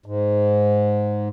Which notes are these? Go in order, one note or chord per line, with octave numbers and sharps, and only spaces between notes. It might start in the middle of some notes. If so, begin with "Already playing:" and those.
G#2